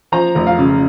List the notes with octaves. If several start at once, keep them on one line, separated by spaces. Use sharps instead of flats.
F3 A#5
F1
F5
C#3